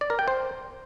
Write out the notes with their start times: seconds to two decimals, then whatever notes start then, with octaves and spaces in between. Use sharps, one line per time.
0.01 D5
0.10 A#4
0.19 G5
0.28 C5